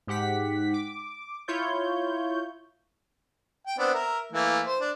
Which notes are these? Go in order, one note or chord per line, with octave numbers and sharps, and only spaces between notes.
G#2 G4 F#5 B6
D6
E4 F4 C#5 G6
G5
B3 C4 D4
A#4 E5
E3 A3 A#3
C5
D4